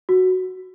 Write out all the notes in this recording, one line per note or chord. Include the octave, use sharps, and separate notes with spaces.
F#4